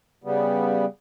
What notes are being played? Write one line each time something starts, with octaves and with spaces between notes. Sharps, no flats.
C#3 G3 B3